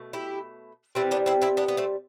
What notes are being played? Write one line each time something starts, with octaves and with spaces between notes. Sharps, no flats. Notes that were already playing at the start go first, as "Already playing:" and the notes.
Already playing: B2 A3
E4 G4
C3 E3 G3 C4 E4
B3 D4
C4 E4
C4 E4
B3 D4
B3
A3 C4